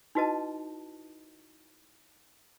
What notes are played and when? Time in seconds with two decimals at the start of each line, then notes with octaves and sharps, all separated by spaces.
0.15 D#4 E4 F#4 B4 D#5 A5